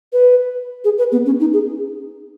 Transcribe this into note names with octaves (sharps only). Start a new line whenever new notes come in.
B4
G#4
B4
B3
C#4
D#4
G#4